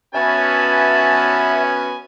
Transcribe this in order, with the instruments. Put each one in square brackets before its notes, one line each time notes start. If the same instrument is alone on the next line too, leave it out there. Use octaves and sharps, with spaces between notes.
[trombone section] B3 C#4 [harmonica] F#4 B4 G#5 [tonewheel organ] E5 [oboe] A5